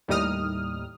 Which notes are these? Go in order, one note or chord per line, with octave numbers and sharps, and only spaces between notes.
D#2 A2 G3 D#4 D#6 F6